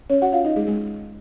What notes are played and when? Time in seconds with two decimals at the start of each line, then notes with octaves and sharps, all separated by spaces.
0.10 C#4 C#5
0.22 F#4 F#5
0.32 F4 F5
0.44 D#4 D#5
0.56 G#3 G#4
0.67 G#3 G#4